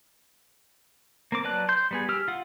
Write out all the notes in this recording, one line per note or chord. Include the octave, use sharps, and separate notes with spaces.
A#3 C4 D6
F#3 B4 D5 A5 F#6
C6 G6
G3 B3 G#4
G4 E6 F6
F4 F#5